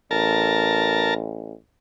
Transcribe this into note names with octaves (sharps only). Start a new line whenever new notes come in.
A1 A#4 A5